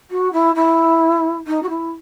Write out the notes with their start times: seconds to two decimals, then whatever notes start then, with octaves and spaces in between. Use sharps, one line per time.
0.10 F#4
0.32 E4
0.55 E4
1.47 D#4
1.62 F#4
1.69 E4